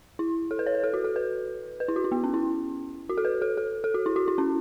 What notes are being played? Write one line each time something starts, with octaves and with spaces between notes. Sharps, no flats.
E4
A4
B4
C#5
B4
A4
F#4
A4
B4
B4
E4
F#4
E4
B3
C#4
E4
F#4
A4
B4
A4
A4
A4
F#4
E4
F#4
E4
C#4